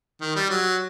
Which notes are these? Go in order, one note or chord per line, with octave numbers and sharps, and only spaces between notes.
D#3
G3
F#3